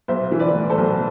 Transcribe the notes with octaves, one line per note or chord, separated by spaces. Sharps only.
B1 C5 E5
E3
B4 D5
A2
A4 C5
B1